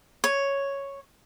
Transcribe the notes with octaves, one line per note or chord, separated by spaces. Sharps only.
C#5